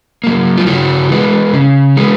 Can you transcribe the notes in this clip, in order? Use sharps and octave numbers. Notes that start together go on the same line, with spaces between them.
F#3 A#3
F4
C#3 E4 F#4
E3 G#3 B3
C#3
E3 G#3 B3